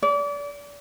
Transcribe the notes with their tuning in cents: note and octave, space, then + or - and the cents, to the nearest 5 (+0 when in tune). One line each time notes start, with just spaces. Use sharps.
D5 -30